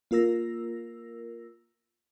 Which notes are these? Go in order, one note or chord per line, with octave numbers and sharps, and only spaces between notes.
A#3 F4 A#4 E6 A#6